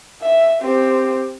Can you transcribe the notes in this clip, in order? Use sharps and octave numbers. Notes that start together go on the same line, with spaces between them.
E5
C4 G4